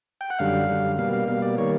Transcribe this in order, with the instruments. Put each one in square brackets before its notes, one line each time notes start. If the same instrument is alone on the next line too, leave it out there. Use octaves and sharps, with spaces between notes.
[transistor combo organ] G5
F#5
F#2 D3 G3 F5
F#2 D3 G3
B2 G3 A#3 F5
F5
B2 G3 A#3 F5
D5
D#3 G3 A#3 C#5